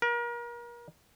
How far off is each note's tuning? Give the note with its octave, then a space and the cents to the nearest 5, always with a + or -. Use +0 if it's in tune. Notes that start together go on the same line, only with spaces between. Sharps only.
A#4 +35